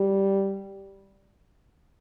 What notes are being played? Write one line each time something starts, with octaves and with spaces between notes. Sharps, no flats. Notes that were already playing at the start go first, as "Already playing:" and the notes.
Already playing: G3